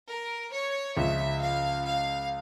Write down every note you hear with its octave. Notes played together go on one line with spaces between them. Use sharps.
A#4
C#5
C#2 C#3 F3 E5
F5
F5